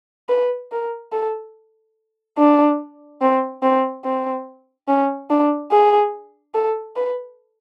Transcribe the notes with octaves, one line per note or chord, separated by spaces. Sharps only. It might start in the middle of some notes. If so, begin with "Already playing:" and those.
B4
A#4
A4
D4
C4
C4
C4
C#4
D4
G#4
A4
B4